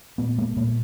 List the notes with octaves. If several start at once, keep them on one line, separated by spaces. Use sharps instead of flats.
A#2 A3 B3
G#3 A#3
A#2 G#3 A#3